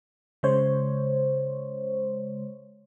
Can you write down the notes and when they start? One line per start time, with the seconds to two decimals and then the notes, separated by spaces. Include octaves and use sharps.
0.43 C#3 G#3 C5 C#5